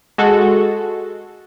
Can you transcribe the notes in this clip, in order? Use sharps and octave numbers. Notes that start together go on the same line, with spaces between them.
G#3 F#4 A4